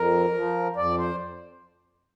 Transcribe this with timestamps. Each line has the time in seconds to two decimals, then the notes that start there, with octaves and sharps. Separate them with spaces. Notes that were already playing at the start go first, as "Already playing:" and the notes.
Already playing: F2 A#4
0.34 F3
0.76 F2 D5
0.98 C5